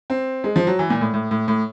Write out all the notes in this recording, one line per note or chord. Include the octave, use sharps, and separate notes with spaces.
C4
G#3
F3
F#3
E3
A#2
A2
A2
A2
A2